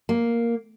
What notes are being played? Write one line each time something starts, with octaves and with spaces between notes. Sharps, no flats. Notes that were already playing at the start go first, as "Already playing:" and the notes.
A#3